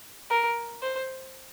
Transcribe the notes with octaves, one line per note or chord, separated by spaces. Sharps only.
A#4
C5